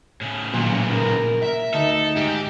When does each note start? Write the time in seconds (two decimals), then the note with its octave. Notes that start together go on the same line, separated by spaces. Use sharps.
0.21 A2 C#3
0.54 A#2 D#3 F#3
0.92 A#4
1.42 E5
1.74 D2 D#4 A4
2.16 G#2 G4